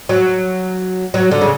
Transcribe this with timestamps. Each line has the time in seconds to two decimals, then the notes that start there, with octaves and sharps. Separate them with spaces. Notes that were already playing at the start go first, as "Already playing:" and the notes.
0.09 F#3
1.14 F#3
1.31 D3
1.41 C#3